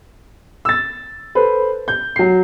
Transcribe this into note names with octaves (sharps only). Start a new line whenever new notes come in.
E6 A6
A4 B4 C5
G6
F#3 C7